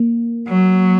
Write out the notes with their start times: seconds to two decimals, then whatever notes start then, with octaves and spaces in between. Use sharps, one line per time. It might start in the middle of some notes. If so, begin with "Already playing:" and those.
Already playing: A#3
0.49 F#3